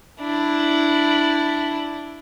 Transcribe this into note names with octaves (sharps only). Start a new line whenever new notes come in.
D4 E4